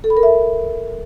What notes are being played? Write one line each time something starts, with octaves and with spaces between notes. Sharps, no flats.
A4
B5
A#4
E5